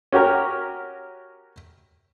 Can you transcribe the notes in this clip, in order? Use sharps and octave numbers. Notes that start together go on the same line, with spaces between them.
C#4 F#4 G4 A#4